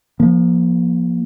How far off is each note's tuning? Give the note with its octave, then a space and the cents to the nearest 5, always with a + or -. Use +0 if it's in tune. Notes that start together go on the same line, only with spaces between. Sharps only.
F3 +0 A#3 +35